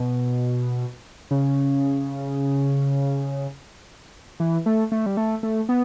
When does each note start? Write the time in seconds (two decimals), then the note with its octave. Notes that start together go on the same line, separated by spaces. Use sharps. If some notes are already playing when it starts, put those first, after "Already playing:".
Already playing: B2
1.31 C#3
4.40 E3
4.66 A3
4.92 A3
5.06 G3
5.17 A3
5.43 A3
5.69 B3